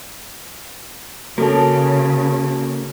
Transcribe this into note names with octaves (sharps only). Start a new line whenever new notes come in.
C#3 A#3 C#4 F#4 A4 A5